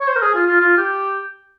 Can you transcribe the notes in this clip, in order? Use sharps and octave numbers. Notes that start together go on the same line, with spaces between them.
C#5
C5
A#4
G#4
F4
F4
F4
G4